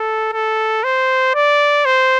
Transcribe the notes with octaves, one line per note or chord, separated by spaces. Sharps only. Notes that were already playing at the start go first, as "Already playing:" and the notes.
Already playing: A4
A4
C5
D5
C5